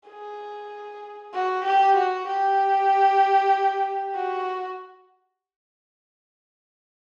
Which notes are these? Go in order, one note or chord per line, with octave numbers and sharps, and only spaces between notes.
G#4
F#4
G4
F#4
G4
F#4